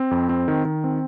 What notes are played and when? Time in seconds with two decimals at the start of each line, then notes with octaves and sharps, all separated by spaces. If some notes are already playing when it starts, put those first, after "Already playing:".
Already playing: C4
0.11 F2
0.29 C4
0.48 D#3
0.65 D#3
0.84 C4